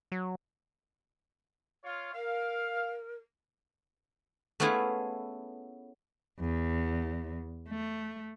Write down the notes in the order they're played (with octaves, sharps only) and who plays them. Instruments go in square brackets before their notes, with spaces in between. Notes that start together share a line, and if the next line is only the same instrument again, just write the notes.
[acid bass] F#3
[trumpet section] F4 C#5 F5
[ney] A#4 [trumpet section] F5
[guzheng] A3 B3 C#4 E4 F4 G#4
[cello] E2
A3